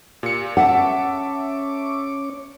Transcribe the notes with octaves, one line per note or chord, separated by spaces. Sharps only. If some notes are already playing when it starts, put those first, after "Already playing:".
A#2 G4 C#7
C#4 A4 C#5 E5 F#5 A5 D6